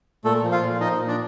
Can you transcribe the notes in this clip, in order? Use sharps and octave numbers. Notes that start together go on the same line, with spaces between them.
A#2 A3 A4
F3
F4 F5
A#2
F3 D#4 D#5
A#2
D4 D5